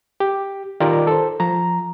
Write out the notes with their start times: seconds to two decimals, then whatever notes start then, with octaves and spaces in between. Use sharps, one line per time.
0.20 G4
0.80 D#3 D#4 F4 G4 A#4 D5
1.07 A4 C5
1.40 F3 A#5